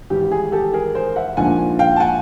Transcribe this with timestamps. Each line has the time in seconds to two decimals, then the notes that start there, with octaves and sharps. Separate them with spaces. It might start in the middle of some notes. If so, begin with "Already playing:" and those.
0.10 G#1 G#2 E3 G3 G4
0.31 G#4
0.52 G4 A4
0.73 G#4 A#4
0.95 A#4 C5
1.16 E5 F#5
1.37 A#1 G#2 F3 A#3 D4 F#5 G#5
1.79 F5 G5
1.96 A5
2.00 F#5 G#5